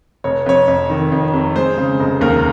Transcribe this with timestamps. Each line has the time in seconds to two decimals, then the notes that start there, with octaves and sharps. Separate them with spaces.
0.24 F1 C#5
0.46 F2 C#5
0.68 F2
0.90 D#3
1.12 F2
1.33 C3
1.56 G#3 C5
1.78 C#3
2.00 F1
2.21 D#2 A#4